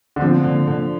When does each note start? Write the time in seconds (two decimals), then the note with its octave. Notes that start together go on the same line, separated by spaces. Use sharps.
0.16 D3
0.21 F3 C4
0.44 D3
0.67 D3